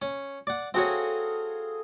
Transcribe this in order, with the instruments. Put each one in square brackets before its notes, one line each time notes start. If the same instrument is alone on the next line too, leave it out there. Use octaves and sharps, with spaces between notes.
[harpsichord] C#4
D5 F#5
[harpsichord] C4 F#4 C#5 [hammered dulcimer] G#4 A4 F5